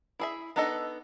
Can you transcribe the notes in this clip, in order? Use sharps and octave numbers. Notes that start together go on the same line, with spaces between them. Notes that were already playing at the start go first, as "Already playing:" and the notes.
E4 G#4 E5
B3 D4 D#4 A4 D#5